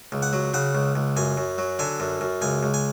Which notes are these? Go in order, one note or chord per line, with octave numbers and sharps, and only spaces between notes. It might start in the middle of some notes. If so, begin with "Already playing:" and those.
C#2
F#5
F#3
C#3 F#5
C#2
C#2
F#2 G#5
F#2
F#3
D3 G#5
F#2
F#2
C#2 G#5
C#2
G#5